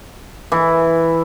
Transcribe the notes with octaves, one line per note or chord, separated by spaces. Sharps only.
E3